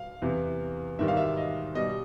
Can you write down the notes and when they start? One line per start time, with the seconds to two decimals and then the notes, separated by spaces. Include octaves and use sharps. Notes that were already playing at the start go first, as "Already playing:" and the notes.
Already playing: F5
0.22 E2 C3 E3
0.99 G#2 D#3 G3 E5
1.08 F5
1.17 E5
1.37 D#5
1.75 B2 G3 D#5